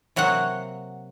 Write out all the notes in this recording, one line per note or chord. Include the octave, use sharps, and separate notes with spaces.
C3 F#3 A#3 F#4 F#5